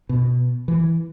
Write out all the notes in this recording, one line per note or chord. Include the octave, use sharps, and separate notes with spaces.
B2
E3